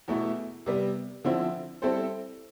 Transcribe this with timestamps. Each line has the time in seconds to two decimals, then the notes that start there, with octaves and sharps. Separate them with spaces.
0.08 E2 B2 A3 E4
0.66 C3 G3 B3
1.24 D3 F3 C4 E4
1.82 G3 C4 E4 A4 C5